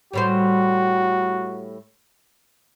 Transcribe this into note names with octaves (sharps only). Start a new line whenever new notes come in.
A2 G3 F#4 C5